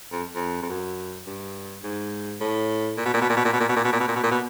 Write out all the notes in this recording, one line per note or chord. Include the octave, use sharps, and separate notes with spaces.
F2
F2
F2
F#2
G2
G#2
A2
A#2
B2
A#2
B2
A#2
B2
A#2
B2
A#2
B2
A#2
B2
A#2
B2
A#2
B2
A#2
B2